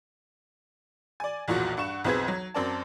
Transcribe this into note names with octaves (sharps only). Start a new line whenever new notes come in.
D5 G#5
B1 E2 A#2 F3 F#4
G2 F#5 C#6 E7
B1 F2 C4 G#4 B4 G#6
F#3
F#2 C4 A#4 D5 A5